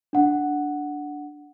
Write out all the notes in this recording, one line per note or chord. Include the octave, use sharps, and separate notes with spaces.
D4 F#5